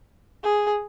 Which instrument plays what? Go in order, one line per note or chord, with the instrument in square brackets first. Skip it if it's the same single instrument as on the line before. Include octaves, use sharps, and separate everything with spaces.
[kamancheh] G#4